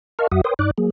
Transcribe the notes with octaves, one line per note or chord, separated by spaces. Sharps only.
A#4 D#5 F5 A5 C#6 F6
F2 F#3 F#4 E5 F#5 D#6
A#4 B4 C#5 G5 C6 D#6
G2 D#4 D5 D6 F#6
F#3 A#3 G#4